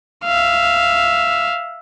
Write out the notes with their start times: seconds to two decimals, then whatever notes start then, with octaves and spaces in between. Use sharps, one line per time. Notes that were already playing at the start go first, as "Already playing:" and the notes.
0.25 E5 F5